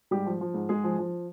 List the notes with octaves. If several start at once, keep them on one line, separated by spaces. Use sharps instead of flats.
G#2 G3 G4
F3
F3
G#2
G#2 G#3 G#4
F3
F3